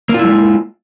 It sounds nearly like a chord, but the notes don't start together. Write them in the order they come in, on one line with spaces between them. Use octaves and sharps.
A#3 F4 E4 G3 G#3